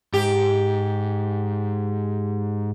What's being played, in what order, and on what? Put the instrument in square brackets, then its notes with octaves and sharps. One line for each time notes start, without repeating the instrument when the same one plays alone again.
[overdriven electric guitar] G#2 [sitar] G4